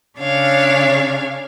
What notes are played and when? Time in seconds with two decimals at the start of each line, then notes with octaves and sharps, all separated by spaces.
0.19 C#3 D4 C#5 F5